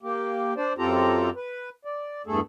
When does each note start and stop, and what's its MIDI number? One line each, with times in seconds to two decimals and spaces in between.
0.03 0.54 58
0.03 0.54 67
0.57 0.73 62
0.57 0.73 72
0.57 0.73 74
0.78 1.30 42
0.78 1.30 60
0.78 1.30 65
0.78 1.30 67
0.78 1.30 69
0.78 1.30 82
1.36 1.70 71
1.85 2.22 74
2.27 2.40 40
2.27 2.40 43
2.27 2.40 57
2.27 2.40 68
2.27 2.40 69